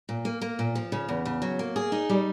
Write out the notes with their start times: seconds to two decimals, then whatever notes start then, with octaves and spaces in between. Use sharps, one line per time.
0.09 A#2
0.25 A#3
0.41 A#3
0.59 A#2
0.75 F3
0.92 C#3
1.09 E2
1.25 C#3
1.42 F#3
1.59 A#3
1.76 G#4
1.92 D#4
2.09 G3